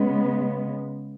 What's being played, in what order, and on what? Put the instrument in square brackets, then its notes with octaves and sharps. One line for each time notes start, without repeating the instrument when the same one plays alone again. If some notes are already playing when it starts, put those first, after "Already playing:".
Already playing: [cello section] C#3 G#3 B3